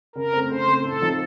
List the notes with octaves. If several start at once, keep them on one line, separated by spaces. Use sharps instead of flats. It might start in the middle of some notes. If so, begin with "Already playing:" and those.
C#3 A#4
A3 C4
C#3 C5
A3 C4
A2 A4
F3 C4 D#4